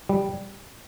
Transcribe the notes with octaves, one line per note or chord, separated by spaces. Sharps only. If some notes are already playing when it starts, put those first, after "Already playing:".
G3